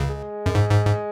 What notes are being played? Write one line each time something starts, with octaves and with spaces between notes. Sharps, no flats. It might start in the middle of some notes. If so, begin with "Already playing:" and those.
Already playing: C#2 C#3
G#3
F#2
G#2
G#2
G#2